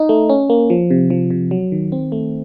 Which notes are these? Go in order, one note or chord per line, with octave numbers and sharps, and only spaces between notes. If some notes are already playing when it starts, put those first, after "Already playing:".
Already playing: D#4
A3
C#4
A#3
F3
C3
F3
C3
F#3
D#3
C4
A3